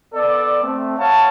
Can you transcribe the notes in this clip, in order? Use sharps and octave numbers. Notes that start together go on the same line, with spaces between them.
B3 A4 D5
A3 C4
C#5 F5 F#5 A5